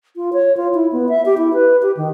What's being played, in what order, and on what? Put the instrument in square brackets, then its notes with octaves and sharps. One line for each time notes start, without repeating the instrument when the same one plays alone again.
[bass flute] F4
C#5
F4
E4
B3
E5
G4
E4
B4
G4
D#3